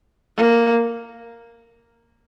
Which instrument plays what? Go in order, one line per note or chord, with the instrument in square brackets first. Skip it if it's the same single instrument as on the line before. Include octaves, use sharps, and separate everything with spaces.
[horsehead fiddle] A#3